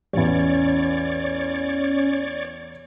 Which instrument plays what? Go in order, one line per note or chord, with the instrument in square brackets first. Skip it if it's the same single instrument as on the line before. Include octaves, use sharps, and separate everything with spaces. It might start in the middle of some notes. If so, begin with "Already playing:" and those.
[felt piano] A1 E2 [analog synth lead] C#4 [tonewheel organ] C#5 D5